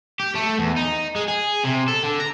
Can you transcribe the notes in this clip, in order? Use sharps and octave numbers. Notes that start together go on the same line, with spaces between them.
G4
A3
E2
D#4
G#3
G#4
C3
A4
D3
A#5